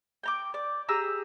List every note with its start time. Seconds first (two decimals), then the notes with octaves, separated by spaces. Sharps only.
0.23 G5 A#5 D6
0.54 D5
0.89 G4 G#4 A#5 E6